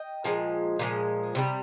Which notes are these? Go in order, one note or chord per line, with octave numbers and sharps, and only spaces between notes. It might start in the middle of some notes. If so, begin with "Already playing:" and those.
Already playing: D#5 G5
A#2 F3 G#3
A#2 F3 G#3
C3 D#3 G3